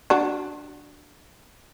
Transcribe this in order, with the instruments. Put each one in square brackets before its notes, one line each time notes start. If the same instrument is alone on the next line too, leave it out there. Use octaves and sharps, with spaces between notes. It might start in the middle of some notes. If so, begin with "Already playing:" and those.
[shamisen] D4 F#4